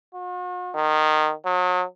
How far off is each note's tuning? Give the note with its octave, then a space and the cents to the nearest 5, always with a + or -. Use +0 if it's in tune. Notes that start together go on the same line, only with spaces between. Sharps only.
F#4 -45
D#3 -15
F#3 -35